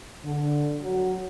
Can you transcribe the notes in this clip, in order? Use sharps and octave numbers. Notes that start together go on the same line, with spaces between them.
D3
F#3